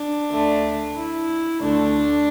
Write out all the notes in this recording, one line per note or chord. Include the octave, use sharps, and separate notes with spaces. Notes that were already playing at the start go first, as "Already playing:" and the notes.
Already playing: D4
D2 D3 A3
E4
D2 D3 A3 D4